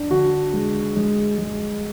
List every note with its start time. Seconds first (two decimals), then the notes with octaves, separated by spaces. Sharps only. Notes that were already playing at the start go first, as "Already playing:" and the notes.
Already playing: D4
0.11 D3 F#4
0.53 G#3
0.96 G#3
1.38 G#3